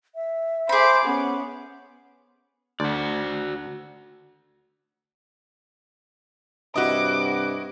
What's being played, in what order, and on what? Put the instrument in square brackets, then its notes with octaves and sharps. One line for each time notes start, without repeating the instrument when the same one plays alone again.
[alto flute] E5
[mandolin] G#4 B5 [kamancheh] C5 D6
[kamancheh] B3 [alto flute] C#4
[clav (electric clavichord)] D2 [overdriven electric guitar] F#4 D5
[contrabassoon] G2 [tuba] C3 [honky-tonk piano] E4 F#4 D#5 [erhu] D6